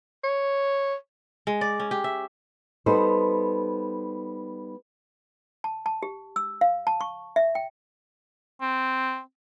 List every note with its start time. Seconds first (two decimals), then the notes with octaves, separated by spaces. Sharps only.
0.24 C#5
1.47 G#3
1.61 D5
1.80 C#4
1.91 G4
2.04 E5
2.86 G3 B3 D#4 A4 C5
5.64 A5
5.86 A5
6.03 G4
6.36 E6
6.61 F5
6.87 A5
7.01 C#6
7.36 E5
7.55 G5
8.61 C4